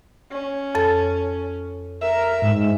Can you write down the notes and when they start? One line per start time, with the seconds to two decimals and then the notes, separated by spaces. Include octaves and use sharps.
0.31 C#4
0.75 F2 A4 A6
2.01 A#4 E5
2.42 G#2